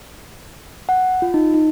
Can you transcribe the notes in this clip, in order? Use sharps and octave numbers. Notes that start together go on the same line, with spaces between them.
F#5
F4
D#4
D#4